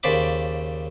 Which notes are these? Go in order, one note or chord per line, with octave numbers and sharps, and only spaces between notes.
D#2 C#3 C5 D5 B5 D6